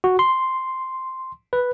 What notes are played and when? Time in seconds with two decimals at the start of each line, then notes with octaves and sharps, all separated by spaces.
0.04 F#4
0.19 C6
1.53 B4